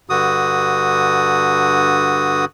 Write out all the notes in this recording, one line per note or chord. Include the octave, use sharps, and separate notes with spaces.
G2 D3 F#4 D#6